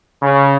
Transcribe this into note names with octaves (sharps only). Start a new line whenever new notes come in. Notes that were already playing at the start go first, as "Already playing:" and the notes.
C#3